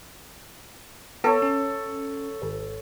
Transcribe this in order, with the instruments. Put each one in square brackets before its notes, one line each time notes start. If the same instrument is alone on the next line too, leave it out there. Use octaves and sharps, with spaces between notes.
[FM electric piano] B3 [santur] A4 C#5
[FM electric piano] C#4
G#1